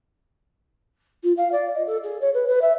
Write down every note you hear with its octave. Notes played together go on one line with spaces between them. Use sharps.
F4
F5
D5
D#5
A4
G#4
C#5
B4
B4
E5